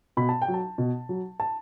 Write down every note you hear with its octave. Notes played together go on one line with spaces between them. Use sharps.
B2 B5
A5
G5
F#3
A5
B2
F#3
A5